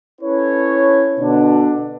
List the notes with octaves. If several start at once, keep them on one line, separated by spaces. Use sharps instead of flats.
C#4 E4 A4 B4 C#5
B2 D3 D4